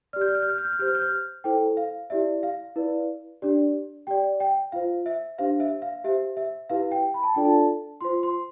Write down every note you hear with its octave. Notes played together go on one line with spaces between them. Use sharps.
G4 D5 F6
G6
F6
G6
F6
G6
F6
G6
F6
G4 C5 G6
F6
G6
F6
E4 A4 C5 G5
F5
E4 G4 D5 E5
F5
E4 B4 D5
D4 G4 D5
G4 D5 G5
G5
F4 C5 F5
E5
D4 G4 C5 F5
E5
F5
G4 C5 E5
E5
E4 G4 B4 F5
G5
B5
A5
D4 F4 A4 D5 G5
A5
F4 C5 C6
C6